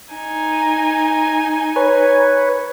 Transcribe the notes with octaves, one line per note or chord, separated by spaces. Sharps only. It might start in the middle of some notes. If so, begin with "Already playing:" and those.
D#4 G#5
B4 C#5